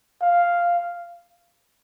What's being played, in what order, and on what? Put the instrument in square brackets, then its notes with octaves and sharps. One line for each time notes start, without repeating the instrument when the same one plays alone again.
[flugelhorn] F5